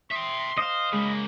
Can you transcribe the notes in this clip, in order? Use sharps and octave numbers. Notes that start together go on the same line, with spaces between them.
E5 G5 C6 D#6
C5 D#5 F5
C#3 G#3 A#3 B5